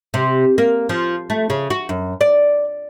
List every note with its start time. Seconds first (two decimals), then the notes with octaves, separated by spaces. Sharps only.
0.14 C3
0.58 A#3
0.89 F3
1.30 A3
1.50 C#3
1.70 F#4
1.89 F#2
2.21 D5